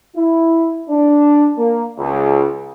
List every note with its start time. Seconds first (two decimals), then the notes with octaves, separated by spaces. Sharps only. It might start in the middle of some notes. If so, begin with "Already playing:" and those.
0.17 E4
0.90 D4
1.58 A#3
1.99 C#2